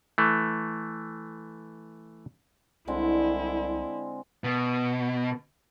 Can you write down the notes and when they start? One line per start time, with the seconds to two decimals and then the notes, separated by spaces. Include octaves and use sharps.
0.18 E3 A3
2.88 C2 D3 G#3 C4 E4
4.44 B2